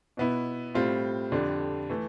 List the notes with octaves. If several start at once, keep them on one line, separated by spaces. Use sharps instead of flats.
B2 B3 E4
A2 G3 C4 F4
F2 D3 G3 D4
E3 A3